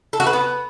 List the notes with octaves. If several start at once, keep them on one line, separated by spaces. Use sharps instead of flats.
A4
F#4
B4
B3